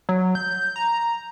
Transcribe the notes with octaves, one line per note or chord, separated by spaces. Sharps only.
F#3
G6
A#5